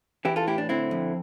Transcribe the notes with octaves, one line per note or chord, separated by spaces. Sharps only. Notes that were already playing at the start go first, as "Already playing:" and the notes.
E3 E4 G4
F4 A4
A2 E4 G4
D4
D3 C4 E4
F2